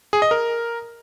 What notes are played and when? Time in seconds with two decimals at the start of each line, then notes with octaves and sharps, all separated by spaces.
0.13 G#4
0.22 D#5
0.31 A#4